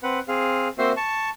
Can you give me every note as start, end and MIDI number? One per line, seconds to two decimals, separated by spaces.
0.03 0.19 60
0.03 0.19 71
0.03 0.19 78
0.28 0.68 60
0.28 0.68 68
0.28 0.68 77
0.78 0.92 58
0.78 0.92 60
0.78 0.92 66
0.78 0.92 72
0.78 0.92 76
0.78 0.92 84
0.97 1.30 81
0.97 1.30 85